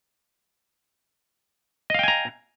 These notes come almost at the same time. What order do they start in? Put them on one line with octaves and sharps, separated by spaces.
D#5 F5 G5 G#5 A#5